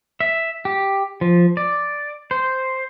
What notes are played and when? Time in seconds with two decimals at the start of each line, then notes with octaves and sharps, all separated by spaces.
0.20 E5
0.65 G4
1.21 F3
1.57 D5
2.31 C5